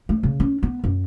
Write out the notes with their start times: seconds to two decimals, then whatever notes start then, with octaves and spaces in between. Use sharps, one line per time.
0.09 A3
0.23 C#3
0.40 C#4
0.63 B3
0.84 F#2